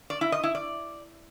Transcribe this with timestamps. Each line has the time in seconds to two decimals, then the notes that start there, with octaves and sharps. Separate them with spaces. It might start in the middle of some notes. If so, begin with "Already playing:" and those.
0.10 D5
0.21 E4
0.32 D#5
0.44 E4
0.55 D5